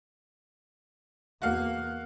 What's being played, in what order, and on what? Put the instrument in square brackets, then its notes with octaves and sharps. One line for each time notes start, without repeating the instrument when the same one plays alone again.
[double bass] E2 A#3 [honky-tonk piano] F#4 F5